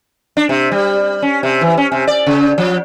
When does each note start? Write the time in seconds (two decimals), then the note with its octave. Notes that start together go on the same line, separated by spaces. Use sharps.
0.37 D4
0.49 C3
0.71 G3
1.22 C#4
1.43 C3
1.61 E3
1.77 C#4
1.92 C3
2.07 D5
2.27 C#3
2.58 F3